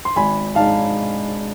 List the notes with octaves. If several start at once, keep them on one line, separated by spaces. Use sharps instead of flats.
C6
G#1 G#5 B5
G#2 G#3 D4 F5 A5